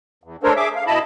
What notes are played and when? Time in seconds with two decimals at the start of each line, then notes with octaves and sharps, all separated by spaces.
0.24 E2
0.43 A3 D4 A4 A#4 C5 C#5
0.56 G#4 E5 D6
0.76 F5
0.87 B2 E4 D#5 A5 B5